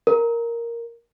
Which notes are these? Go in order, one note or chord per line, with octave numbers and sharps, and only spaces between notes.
A#4